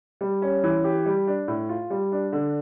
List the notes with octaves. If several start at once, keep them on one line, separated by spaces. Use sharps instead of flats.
G3
C#4
E3
G4
G3
D4
A2
F4
G3
D4
D3